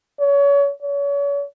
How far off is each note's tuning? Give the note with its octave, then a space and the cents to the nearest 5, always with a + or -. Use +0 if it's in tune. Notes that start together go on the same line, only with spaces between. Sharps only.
C#5 +30
C#5 +35